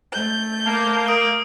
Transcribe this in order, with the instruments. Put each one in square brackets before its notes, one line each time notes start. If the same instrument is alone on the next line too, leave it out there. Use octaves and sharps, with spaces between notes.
[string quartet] A3 G6
[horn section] A#3 [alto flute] A5
[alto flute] A#4 [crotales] D#6 D7